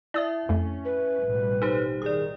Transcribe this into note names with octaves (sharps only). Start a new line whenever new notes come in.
E4 D5 E5 D#6
F2 A3 C#4
B4
A1 B2 G3
D#4 G4 A4 C5
D#3 G#4 D5 D#6